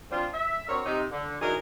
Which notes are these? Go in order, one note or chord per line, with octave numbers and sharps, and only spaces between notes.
F3 C4 D4 F4
E5
C4 D4 F#4 A#4 C#5
C3 D#4
D3
E3 F#3 D4 D#4 G#4 A#4